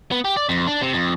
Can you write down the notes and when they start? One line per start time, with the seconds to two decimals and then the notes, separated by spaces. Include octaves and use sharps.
0.11 B3
0.25 G4
0.37 D5
0.49 F2
0.67 D4
0.81 C3
0.93 F2